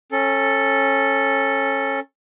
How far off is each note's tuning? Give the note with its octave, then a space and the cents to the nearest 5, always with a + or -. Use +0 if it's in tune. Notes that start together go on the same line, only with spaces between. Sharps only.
C#4 -25 A4 +0